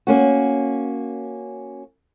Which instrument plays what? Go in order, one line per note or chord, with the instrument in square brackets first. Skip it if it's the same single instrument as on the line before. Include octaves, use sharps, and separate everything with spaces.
[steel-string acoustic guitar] A#3 C#4 F#4